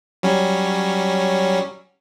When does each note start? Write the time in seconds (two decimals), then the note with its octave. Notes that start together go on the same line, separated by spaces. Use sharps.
0.23 F#3 G3 C#4